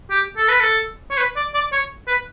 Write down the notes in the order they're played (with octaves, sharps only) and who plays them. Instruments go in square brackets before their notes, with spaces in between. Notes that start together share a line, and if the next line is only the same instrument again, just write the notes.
[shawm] G4
A4
B4
A4
C#5
B4
D5
D5
C#5
B4